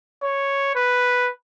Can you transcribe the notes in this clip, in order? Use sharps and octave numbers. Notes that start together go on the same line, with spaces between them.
C#5
B4